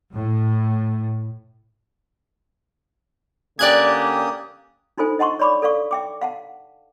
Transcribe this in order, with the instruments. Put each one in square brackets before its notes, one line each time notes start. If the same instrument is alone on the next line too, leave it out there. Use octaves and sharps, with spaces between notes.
[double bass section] A2
[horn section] D3 G4 [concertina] A#3 C#4 D#6 [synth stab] D5 F#6 G#6
[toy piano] D4 D#4 F4 A4 C5 G#5
D#5 F#5 A5 C6 C#6
C#5 D5 B5 C#6 D6
A4 D5 F5 C#6
E5 G5 D6
F5 F#5 A5